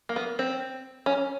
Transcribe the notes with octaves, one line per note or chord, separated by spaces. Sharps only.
A#3
B3
C4
C#4